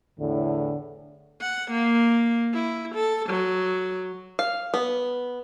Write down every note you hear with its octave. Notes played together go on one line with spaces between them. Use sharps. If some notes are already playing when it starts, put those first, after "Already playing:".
E2 A2 D3
F#5
A#3
E4
A4
F#3
F5
B3